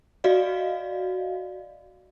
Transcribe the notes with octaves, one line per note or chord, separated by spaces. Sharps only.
F#4 D5 D#5 F5